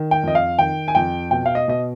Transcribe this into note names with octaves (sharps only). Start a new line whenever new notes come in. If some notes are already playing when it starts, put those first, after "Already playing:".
Already playing: D#3
G5
F2 D#5
F5
D#3 G5
G#5
F2 G5
B2 G5
F5
D#5
B2 D#5